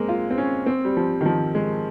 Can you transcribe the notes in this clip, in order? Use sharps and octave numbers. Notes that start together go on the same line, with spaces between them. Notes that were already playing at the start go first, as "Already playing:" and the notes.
Already playing: G#3 A#3 C4
F4
C4
C#4
C4
G3
F3
D#3
F3
G#3